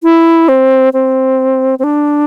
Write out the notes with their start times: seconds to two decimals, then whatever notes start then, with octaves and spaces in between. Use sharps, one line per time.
0.03 E4
0.49 C4
0.93 C4
1.79 C4
1.84 D4